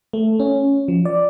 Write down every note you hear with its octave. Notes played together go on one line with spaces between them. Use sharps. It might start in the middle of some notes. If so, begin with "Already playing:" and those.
A3
C#4
F3
D5